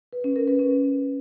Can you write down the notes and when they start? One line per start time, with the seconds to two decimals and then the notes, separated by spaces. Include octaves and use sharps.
0.13 B4
0.24 C#4
0.36 A#4
0.48 B4
0.59 C#4